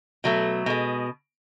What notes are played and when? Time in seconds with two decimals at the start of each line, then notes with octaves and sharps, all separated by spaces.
0.24 B2 F#3 A3
0.66 B2 G#3